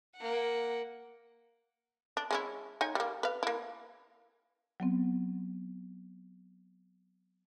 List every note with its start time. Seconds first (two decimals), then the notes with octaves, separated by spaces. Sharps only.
0.17 A#3 F#5
2.17 D4
2.31 G#3 C#4 E4
2.81 D#4 C#5 G#5
2.95 G3 A#3
3.23 B4 F5
3.43 A#3 E4
4.80 F#3 B3 C4